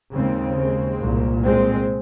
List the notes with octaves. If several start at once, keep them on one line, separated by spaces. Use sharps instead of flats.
D#2 C#3 G#3 C4
G#3 C4
C2 A#2
G#3 C4